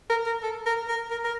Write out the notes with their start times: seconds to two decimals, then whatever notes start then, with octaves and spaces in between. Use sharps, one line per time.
0.10 A#4
0.26 A#4
0.43 A4
0.66 A#4
0.88 A#4
1.10 A#4
1.24 A#4